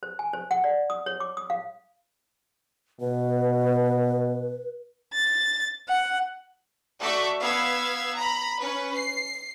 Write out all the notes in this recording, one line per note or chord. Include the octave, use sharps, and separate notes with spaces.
C5
G#5
C5
F#5
D5
D#6
C#5
D6
D#6
F5
B2 B4
A6
F#5
A3 F#4 A4 D5 E5
B3 F5 E6 G#6
A#5 B5
C#4 B4
C7